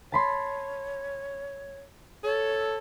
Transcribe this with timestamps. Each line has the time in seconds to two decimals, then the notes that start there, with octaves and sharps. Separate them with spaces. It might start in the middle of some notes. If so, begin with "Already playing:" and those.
0.12 C#5 A5 B5 C6
2.24 A4 C#5